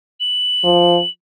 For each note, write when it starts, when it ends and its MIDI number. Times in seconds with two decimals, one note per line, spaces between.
0.20 1.10 102
0.64 0.99 53